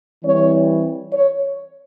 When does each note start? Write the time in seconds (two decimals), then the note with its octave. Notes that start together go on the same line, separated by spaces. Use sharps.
0.24 E3 G3 C4 C#5
1.13 C#5